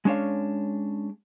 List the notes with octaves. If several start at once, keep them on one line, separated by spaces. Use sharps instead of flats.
G#3 C#4 D4 C#5 F5